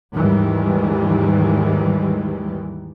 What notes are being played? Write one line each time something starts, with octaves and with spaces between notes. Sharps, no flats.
D#2 G#2 D#3 E3 G3 G#3